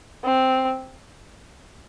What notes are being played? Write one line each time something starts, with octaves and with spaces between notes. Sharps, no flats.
C4